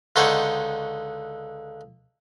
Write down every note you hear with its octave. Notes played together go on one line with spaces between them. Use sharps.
C#2 D3 D#4 C5 C#5 F#5